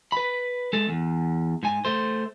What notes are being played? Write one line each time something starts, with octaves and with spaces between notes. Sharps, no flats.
B4 B5
G#3 A4
E2
G#2 G#5
A3 C5